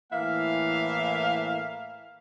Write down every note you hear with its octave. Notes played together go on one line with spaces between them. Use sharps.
A2 E3 A#3 E5 F5